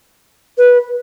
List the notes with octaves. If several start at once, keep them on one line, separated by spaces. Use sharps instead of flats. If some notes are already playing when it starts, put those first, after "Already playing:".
B4